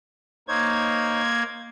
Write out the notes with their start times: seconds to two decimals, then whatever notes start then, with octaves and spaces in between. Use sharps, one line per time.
0.48 A#3 D#4 C5 C#5 G#6